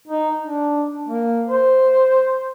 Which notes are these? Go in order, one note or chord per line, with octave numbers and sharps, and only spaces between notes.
D#4
D4
A#3
C5